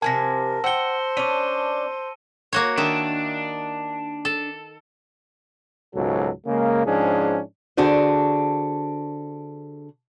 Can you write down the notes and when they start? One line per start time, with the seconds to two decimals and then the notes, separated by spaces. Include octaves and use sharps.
0.02 C3 F3 A#4 G#5 A5 A#6
0.64 C5 F#5 G5 E6 C#7 G7
1.17 C#4 D4 E6 D#7
2.53 A#3 F#4 C#5
2.77 D#3 D4 E5
4.25 A4
5.95 C#2 G#2 B2 F#3 A4
6.47 C#3 G#3 A#3
6.86 G#2 F3 C#4 D4 G#4
7.77 D3 D4 F#4 G#4 C5